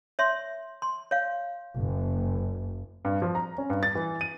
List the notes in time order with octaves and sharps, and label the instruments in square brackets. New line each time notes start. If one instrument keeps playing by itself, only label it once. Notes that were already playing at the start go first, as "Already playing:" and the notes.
[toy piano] C#5 E5 C6
C6
C#5 F5
[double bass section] F#1
[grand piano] G2
F3
A#5
C#4
G2
A6
E3
D#7